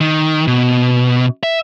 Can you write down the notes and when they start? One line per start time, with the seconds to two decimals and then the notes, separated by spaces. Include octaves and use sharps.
0.01 D#3
0.47 B2
1.43 E5